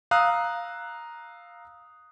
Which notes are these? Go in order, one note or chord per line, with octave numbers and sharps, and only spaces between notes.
F5 A#5 D#6 E6 F#6